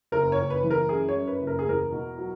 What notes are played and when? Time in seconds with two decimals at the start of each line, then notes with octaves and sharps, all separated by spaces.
0.12 F#1 A#4
0.32 C#5
0.39 F#1
0.50 B4
0.63 E3
0.71 A#4
0.89 F#2 G#4
1.09 C#5
1.15 F#2
1.28 B4
1.40 F#1
1.47 A#4
1.59 G#4
1.67 E2 A#4
1.92 B2
2.18 F#3